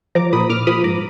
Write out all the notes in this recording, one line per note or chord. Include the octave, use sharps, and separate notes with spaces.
F3 A#5 D6
A#2 B5 D#6
A#2 D6 F6
F3 B5 D#6
G#2 A#5 D6